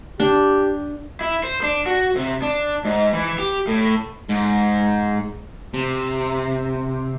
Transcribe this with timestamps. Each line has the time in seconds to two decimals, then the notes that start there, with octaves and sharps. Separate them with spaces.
0.20 D4 G4
1.21 E4
1.44 C5
1.63 D4
1.86 F#4
2.15 C3
2.42 D4
2.85 G#2
3.13 E3
3.38 G4
3.67 A2
4.29 G#2
5.74 C3